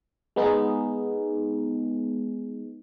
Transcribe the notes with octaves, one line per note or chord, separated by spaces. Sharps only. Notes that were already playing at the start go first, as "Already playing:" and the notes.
G#3 B3 D#4 G#4